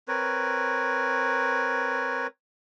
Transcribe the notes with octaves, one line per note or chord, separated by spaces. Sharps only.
C4 A#4 B4 C#5